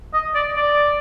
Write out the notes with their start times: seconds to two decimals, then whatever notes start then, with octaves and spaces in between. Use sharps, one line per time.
0.13 D#5
0.35 D5
0.57 D5